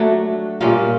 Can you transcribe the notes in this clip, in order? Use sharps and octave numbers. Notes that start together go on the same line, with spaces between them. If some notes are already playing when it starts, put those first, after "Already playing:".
Already playing: F#3 A3 D4 F#4
A#2 G3 A#3 C#4 F4